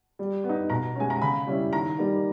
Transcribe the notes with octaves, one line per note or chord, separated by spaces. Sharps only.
G3
B3
D#4
B2 A#5
G#3 C#4 G#5
A#5
C#3 B5
G3 C#4 E4
D#3 A#5
G3 A#3 D#4